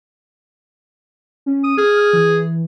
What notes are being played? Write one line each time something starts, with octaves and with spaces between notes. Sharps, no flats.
C#4
D#6
G#4 F6
F6
E3